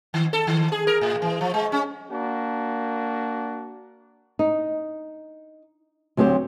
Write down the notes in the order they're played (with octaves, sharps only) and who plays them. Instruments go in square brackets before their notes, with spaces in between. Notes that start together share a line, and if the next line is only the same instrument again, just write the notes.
[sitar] D#3
A4
D#3
G#4
A#4
A2
E3
F3
G#3
C#4
[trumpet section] A#3 D4 F#4
[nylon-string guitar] D#4
D2 F#3 C4 G4 C5